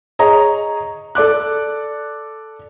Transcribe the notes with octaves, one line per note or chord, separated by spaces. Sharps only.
G#4 C#5 D#5 A#5
A4 D5 D6 F#6